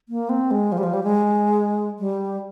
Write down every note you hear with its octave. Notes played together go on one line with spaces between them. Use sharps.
A#3
C4
G#3
F3
G3
F3
G3
G#3
G3